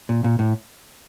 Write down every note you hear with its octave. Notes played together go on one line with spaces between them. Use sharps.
A#2
A#2
A2